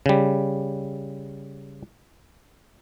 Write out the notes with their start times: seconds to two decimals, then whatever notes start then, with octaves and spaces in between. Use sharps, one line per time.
0.06 C#3 G3